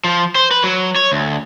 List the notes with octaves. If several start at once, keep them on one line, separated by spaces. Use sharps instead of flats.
F3
C5
B4
F#3
C#5
D2